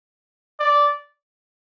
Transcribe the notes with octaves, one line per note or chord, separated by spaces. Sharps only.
D5